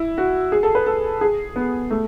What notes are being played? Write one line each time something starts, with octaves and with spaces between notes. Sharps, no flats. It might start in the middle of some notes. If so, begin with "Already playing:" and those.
Already playing: E4
F#4
G#4
A4
B4
A4
G#4
B3
A3